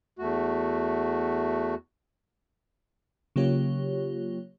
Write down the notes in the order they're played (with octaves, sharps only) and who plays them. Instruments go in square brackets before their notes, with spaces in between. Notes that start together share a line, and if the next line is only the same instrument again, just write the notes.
[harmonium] E2 A3 F#4
[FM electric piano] C#3 F#3 A#3 F4 G4 C#5